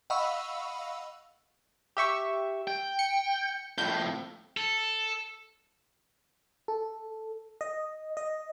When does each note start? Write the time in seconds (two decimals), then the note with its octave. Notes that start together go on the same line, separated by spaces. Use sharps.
0.10 D#5 F5 F#5 B5 C#6 E6
1.97 G4 E5 C#6
2.67 G5
2.99 C#7
3.78 F2 A2 G6
4.57 A4
6.68 A4
7.61 D#5
8.17 D#5